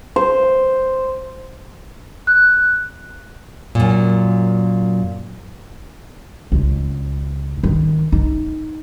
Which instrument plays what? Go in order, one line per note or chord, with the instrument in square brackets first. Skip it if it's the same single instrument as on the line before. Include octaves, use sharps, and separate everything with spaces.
[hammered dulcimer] C5
[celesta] F#6
[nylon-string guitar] F#2 A#2
[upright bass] C#2
D#3
D#4